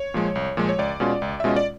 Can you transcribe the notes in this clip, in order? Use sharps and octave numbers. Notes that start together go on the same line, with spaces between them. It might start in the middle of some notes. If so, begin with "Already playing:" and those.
Already playing: C#5
A#2 F3 G#3
C2
A#2 F3 G#3
C#5
C#2 D5
B2 G#3 C#4 F4
C#2
E5
B2 G#3 C#4 F4 D#5
D5